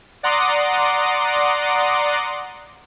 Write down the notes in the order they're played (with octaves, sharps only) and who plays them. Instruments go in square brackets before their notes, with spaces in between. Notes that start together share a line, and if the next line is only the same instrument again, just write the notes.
[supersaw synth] D5 F#5 A#5 C6 D6 D#6